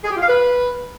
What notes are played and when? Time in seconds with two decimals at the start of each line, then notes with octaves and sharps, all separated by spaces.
0.04 G#4
0.10 G4
0.16 F4
0.22 F5
0.28 B4